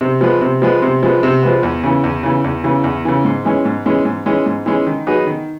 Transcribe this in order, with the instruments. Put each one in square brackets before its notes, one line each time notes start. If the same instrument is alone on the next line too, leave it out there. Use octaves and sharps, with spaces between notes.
[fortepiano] C3
F3 G#3 B3
C3
F3 G#3 B3
C3
F3 G#3 B3
C3
F3 G#3 B3
E2
C#3 E3
E2
C#3 E3
E2
C#3 E3
E2
C#3 E3
G#2
E3 G#3 C#4
G#2
E3 G#3 C#4
G#2
E3 G#3 C#4
G#2
E3 G#3 C#4
D#3
F#3 B3 D#4 G#4
D#3